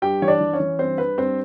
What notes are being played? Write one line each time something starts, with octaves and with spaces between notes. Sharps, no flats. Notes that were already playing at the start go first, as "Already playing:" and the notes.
G2 G4 G5
E3 C#5
D4 D5
E3
C#4 C#5
E3
G2 C4 C5
G2 B4
G2 C4 C5